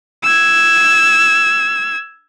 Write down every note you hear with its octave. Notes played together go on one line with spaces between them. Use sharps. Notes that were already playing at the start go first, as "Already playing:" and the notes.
E6 G#6